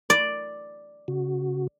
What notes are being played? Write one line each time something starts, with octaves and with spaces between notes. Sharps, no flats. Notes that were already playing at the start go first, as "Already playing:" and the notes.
D5
C#3 F#4